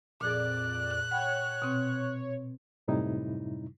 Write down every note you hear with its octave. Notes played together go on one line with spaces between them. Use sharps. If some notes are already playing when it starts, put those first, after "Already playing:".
F2 A#2 G#4 D5 F#6
C#5 F#5 G5 B5
B2 C4
F#2 A2 C3 G3 D#4 E4